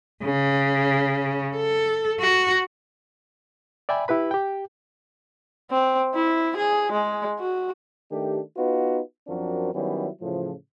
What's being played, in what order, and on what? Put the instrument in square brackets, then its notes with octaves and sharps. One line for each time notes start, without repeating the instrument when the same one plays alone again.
[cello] C#3
A4
F#4
[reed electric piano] D5 E5 G5 G#5 B5
E4 G4 B4 B5
G4 G5
[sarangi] C4
E4
G#4
G#3
F#4
[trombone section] D#3 A3 D4 G4
B3 D#4 F4 F#4 B4
F#2 F3 C4 D4 F#4 A#4
D#3 F#3 G3 B3 C#4 E4
A2 C#3 E3 F3